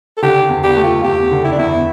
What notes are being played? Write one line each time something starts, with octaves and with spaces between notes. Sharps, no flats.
A4
D3 G4
E2
G4
A3
F4
E2 G4
D3
E4
D4
E2 E4